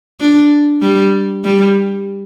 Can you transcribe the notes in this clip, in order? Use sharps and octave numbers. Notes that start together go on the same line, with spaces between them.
D4
G3
G3